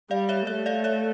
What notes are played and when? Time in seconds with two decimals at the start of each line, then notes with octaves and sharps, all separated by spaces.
0.11 G3 D5 F5
0.29 C#5 E5
0.47 A3 C#5 E5
0.66 D5 F5
0.84 C#5 E5